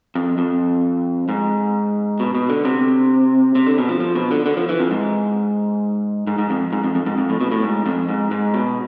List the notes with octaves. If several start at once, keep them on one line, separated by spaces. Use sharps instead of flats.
F2
F2
G#2
B2
B2
D3
C3
C3
D3
B2
F3
F3
B2
D3
D3
F3
E3
F2
G#2
G#2
G#2
F2
G#2
F2
F2
G#2
F2
A2
B2
A2
G#2
F2
G#2
G#2
B2